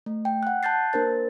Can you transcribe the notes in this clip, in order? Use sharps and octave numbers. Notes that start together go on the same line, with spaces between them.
A3
G5
F#5 F#6
A5 F#6 G6 A6 C7
A#3 D4 A#4 C5 A6